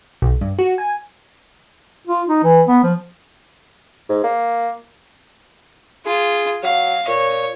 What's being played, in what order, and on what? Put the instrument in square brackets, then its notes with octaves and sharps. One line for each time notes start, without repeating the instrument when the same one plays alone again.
[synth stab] B1
G2
F#4
G#5
[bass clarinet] F4
D#4
E3
B3
F3
[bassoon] G#2
A#3
[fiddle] F4 [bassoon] G#4
[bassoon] F#3 [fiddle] F5
[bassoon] A#2 [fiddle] C#5